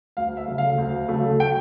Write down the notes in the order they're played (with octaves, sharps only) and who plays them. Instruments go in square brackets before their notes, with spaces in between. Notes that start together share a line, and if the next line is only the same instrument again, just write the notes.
[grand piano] D2 F5
E5
C#3 F#3 A3
F5
D2
C#3 F#3 A3
G5